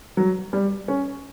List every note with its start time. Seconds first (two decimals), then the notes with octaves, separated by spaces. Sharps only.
0.17 F#3
0.53 G3
0.88 C#4